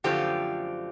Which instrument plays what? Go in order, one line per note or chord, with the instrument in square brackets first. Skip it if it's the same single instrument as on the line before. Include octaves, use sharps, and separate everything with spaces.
[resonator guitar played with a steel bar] F#2 D3 F3 A3 C4 F4 G4